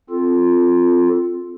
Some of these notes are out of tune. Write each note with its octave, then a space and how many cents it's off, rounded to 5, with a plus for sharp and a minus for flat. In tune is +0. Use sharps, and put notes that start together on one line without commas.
C4 +0 F4 +0 A4 +0